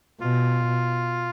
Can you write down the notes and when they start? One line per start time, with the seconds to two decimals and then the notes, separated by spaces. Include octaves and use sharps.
0.21 B2 F4
0.66 B2